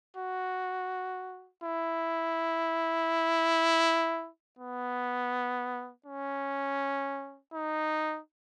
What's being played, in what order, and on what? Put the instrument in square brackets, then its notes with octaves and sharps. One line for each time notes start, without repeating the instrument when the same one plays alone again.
[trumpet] F#4
E4
B3
C#4
D#4